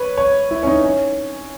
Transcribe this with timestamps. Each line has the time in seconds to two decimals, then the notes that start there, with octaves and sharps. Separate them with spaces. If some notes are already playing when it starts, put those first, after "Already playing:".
Already playing: B4 C#5
0.18 C#5
0.51 E4
0.63 C#4
0.67 D#4
0.84 C#4